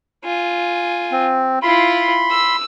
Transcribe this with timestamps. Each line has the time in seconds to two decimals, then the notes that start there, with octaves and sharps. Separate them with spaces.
0.25 F4 G#5
1.11 C4
1.63 E4 F4 B5 C6
2.31 E6